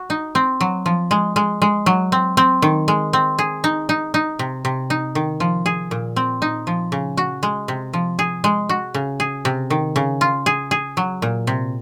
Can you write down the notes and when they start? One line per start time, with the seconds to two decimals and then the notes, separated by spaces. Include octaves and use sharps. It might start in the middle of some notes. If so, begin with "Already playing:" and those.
Already playing: F#4
0.10 D#4
0.35 C4
0.61 F#3
0.86 F3
1.11 G#3
1.36 G#3
1.62 G#3
1.86 F#3
2.12 C4
2.37 C4
2.62 D#3
2.88 G#3
3.13 C4
3.39 G#4
3.64 D#4
3.89 D#4
4.14 D#4
4.39 C3
4.65 C3
4.90 D#4
5.15 D#3
5.40 F3
5.66 G#4
5.91 A#2
6.16 C4
6.42 D#4
6.67 F3
6.92 C#3
7.17 F#4
7.43 G#3
7.68 C3
7.93 F3
8.19 G#4
8.44 G#3
8.69 F#4
8.94 C#3
9.20 G#4
9.45 C3
9.70 D#3
9.96 C#3
10.21 F4
10.46 G#4
10.71 G#4
10.97 F#3
11.22 A#2
11.47 C3